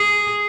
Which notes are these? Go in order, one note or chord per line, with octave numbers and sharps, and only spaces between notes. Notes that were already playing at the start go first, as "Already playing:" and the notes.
Already playing: G#4